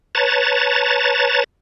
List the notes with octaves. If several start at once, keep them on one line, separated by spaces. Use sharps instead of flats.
B4 C#5 A5 A#5 A6